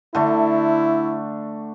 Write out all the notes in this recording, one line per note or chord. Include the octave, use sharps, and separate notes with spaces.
D3 A3 E4